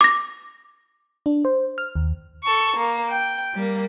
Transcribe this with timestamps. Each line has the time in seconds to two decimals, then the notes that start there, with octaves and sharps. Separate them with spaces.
0.01 D6 A#6
1.26 D4
1.45 C5
1.78 F6
1.95 D#2
2.43 A4 C#6
2.77 A#3
3.09 G5
3.55 G3 A#3